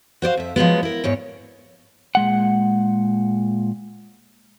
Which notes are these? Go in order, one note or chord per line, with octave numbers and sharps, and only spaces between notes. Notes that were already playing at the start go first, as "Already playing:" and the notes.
F#4 C5 D5 F5
F2 E5
F3 F#3 G#3 B3
E4 A#4
E2 G#2 C#5
A#2 G#3 F#5